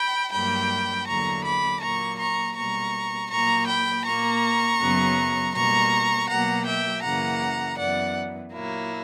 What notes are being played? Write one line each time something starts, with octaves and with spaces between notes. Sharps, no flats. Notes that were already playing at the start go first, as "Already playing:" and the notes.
Already playing: G5 B5
G2 F#3 A#3 G5 B5
E2 D3 F#3 A#3 A#5 C#6
B5 D6
A#2 F#3 A#3 A#5 C#6
A#5 C#6
B2 G3 A#3 A#5 C#6
A#2 F#3 A#3 A#5 C#6
G5 B5
A#2 A#3 A#5 C#6
F#2 C#3 F#3 B3
B2 G3 A#3 A#5 C#6
B2 F#3 A#3 F#5 A#5
E5 G5
F#2 C#3 E3 A#3 F#5 A#5
F#2 E3 B3 D5 F#5
A#2 F#3 A#3 E4